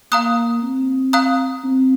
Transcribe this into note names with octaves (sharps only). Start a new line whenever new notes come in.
A#3 F5 A#5 D#6 F#6
C4
F5 A#5 D#6 F#6
C4